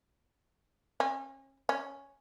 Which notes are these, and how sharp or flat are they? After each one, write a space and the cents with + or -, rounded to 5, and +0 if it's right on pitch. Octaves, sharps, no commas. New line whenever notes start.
C#4 -35
C#4 +0